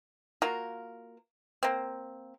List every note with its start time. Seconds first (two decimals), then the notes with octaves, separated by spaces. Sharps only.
0.42 A#3 F4 F#4 A#4
1.63 A#3 C4